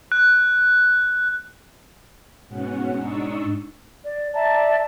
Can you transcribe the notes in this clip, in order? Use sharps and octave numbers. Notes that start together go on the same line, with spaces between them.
F#6
G#2 B2 C#4 F#5
G#2 D4 D#4 C#6 D#6 E6
D5
D5 E5 A5 A#5